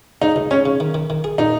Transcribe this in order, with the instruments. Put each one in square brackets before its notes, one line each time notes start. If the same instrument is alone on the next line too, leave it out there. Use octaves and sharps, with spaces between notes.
[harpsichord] C#3 [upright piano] D#4
[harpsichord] C#2
[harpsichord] G#3 [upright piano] C#4
[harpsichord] C#3
D#3
D#3
D#3
G#4
[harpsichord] A#2 [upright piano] D#4